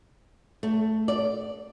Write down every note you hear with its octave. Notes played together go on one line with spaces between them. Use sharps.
A3
D5